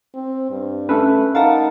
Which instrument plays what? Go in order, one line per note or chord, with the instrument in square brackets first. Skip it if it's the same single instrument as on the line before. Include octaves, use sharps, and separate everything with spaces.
[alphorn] C4
G2
[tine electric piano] A3 A4 B4 [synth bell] C#4
[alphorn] D#4 [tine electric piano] A#4 A5 [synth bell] F5 F#5